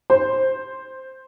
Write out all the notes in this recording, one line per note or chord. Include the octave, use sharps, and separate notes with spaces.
C5